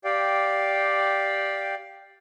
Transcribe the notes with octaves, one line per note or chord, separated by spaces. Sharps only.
G4 D5 F5 G5